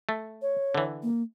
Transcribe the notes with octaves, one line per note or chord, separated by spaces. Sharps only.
A3
C#5
D3 E3
A#3